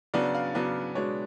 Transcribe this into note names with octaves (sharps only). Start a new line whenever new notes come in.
C#3 F#3 B3 D4 D5
F5
C#3 F#3 B3 D4
B2 G#3 B3 D4 C#5